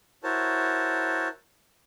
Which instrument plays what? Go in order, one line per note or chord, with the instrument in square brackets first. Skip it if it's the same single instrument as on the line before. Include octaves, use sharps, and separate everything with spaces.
[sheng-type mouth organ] E4 F#4 A#4 C5 C#5 A5